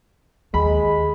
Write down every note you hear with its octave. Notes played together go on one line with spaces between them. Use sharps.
D#2 G#3 B5